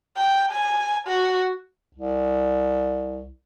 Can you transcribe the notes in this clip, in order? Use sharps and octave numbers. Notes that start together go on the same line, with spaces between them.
G5
G#5
F#4
C2